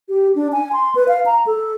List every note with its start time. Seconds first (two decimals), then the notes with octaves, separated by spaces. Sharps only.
0.09 G4
0.36 D4
0.52 G#5
0.73 C6
0.95 B4
1.08 F5
1.26 A#5
1.46 A4